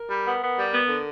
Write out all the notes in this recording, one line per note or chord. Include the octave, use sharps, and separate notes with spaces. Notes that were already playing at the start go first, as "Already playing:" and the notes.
Already playing: A#4
G3
B3
B3
G3
B3
D3